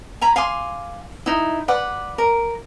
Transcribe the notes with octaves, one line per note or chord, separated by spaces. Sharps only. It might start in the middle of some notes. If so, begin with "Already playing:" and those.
G#5 A#5 B5
F5 G#5 C6 D6
D#4 E4
B4 D5 F#5
A#4